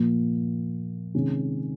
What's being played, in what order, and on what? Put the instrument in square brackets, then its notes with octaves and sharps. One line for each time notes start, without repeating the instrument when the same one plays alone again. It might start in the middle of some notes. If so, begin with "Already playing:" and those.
Already playing: [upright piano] A#2 F3 A#3
C3 D#3 G#3 C#4